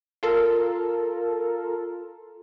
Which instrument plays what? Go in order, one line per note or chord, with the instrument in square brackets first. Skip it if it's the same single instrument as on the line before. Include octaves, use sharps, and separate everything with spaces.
[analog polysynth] F4 A4 A#4